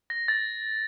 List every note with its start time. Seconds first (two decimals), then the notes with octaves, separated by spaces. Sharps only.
0.10 A#6
0.28 A6